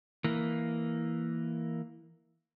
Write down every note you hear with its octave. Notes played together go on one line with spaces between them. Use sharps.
E3 A#3